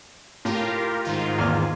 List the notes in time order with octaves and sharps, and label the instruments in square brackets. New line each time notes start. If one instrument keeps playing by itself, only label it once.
[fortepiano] A2 [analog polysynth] F4 G4 A#4
[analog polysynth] G#2 D#3 F4
[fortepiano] E2 A#2 F6